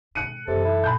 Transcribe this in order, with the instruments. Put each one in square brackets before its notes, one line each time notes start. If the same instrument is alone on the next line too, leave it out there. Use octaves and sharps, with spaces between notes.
[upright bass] G#2 B2 [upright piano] F#6 C#7 D#7
[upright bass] F#2 E3 [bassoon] C3 [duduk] A4
[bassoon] E4
[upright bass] A#2 [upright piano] B5 F#6 G6